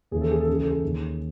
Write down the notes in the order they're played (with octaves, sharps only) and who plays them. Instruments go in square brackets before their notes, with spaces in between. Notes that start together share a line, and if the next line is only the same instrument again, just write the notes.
[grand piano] D#2 C#3 E3 G#4
A4
G#4
A4
C#2 C#3 E3 G#4
A4
G#4
D#2 D#3